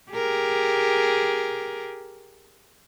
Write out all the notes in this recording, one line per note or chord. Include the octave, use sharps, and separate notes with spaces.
G4 G#4 A#4